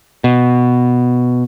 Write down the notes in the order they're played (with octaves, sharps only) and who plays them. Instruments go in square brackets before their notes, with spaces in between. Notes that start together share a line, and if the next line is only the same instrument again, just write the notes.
[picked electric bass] B2